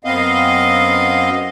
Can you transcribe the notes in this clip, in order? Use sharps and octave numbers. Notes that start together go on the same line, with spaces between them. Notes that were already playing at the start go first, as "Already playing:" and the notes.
F#2 B3 C4 D#5 F5